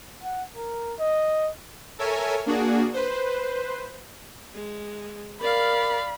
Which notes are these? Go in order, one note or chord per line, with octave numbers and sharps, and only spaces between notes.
F#5
A#4
D#5
A4 A#4 C#5 E5 G#5
A#3 D4 F#4 G#4
B4 C5
G#3
A#4 D5 F5 B5